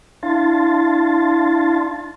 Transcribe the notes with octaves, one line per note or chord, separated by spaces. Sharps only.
D4 E4 F5 A5 C6 A6